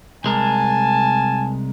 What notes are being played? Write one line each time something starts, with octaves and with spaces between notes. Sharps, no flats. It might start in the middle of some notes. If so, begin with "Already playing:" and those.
C2 G#3 A#4 G#5 A5